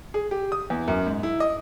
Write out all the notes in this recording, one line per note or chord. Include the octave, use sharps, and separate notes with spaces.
G#4
G4
D#6
E2
F#2
G#2
E4
D#5